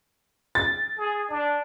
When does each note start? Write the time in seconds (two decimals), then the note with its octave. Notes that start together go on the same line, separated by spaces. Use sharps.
0.55 A6
0.98 G#4
1.30 D4